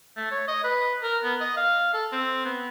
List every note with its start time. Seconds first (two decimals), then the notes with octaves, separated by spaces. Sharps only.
0.17 A3
0.31 C#5
0.48 D#5
0.64 B4
1.03 A#4
1.24 B3
1.41 D#5
1.57 F5
1.94 A4
2.12 C4
2.45 B3